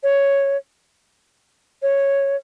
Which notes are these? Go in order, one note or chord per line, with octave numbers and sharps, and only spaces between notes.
C#5
C#5